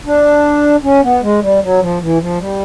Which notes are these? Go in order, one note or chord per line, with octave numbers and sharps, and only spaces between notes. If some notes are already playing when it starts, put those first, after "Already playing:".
D4
C#4
B3
G#3
G3
F#3
F3
E3
F3
G3